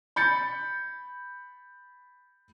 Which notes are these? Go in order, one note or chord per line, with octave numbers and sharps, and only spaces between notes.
B5 G6 A6 C#7